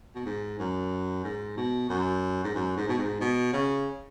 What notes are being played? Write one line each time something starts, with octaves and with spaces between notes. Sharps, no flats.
B2
G#2
F#2
G#2
B2
F#2
G#2
F#2
G#2
B2
G#2
B2
C#3